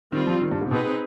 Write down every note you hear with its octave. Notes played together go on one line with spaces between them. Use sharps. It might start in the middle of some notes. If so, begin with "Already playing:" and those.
D#3 G3 C4 F4
F3
D#3
G2
G#2
C3
B2 C4 D#4 G#4 B4